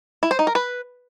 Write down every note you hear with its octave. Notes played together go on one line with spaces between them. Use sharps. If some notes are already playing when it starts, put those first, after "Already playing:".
E4
C5
D#4
A#4
B4